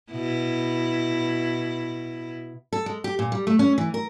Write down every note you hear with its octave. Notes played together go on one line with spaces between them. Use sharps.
B2 E4
A4
G#3
G4
A#2
G3
A3
C#4
E3
A#4